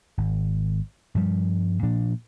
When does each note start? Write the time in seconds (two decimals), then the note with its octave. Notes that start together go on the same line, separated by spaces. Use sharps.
0.18 G#1
1.15 G2 F3 G3
1.83 A#2 F3 D4